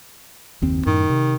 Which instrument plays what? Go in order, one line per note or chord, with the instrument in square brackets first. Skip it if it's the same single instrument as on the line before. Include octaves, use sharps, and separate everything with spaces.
[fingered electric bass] F#1 D#2 C4
[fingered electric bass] F#2 A2 [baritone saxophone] D#3
[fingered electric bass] C3